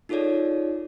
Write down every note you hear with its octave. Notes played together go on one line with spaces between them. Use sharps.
D#4 F4 G#4 A4 C#5 D5